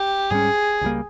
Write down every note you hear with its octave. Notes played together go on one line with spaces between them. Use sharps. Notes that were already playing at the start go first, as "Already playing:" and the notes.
Already playing: G4
G#2 G3 C#4 G#4
C#2 C3 G3 A#3